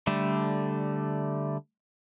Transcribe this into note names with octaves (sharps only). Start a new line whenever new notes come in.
D3 G3 A3